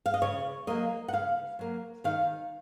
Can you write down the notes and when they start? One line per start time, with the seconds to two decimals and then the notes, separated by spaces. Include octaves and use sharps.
0.06 F5
0.14 D#5
0.22 C#3 C#5
0.67 F#3 A#3 D#5
1.08 F#5
1.13 C#3 F5
1.59 F#3 A#3
2.04 D#3 F5